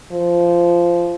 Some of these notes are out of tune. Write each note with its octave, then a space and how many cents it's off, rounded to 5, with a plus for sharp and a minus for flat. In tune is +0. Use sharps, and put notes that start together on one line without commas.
F3 -15